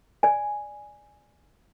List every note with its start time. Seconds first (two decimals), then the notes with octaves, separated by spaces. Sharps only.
0.23 D5 G#5